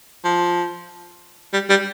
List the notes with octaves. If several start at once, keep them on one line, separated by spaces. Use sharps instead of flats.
F3
G3
G3